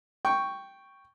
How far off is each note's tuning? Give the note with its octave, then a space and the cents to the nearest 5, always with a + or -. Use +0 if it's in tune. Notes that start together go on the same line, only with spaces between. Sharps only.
G5 +0 C#6 +0